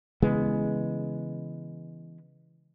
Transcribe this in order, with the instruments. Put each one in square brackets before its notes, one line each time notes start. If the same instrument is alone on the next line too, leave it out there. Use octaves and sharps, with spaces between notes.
[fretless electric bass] C#3 E3 G#3 B3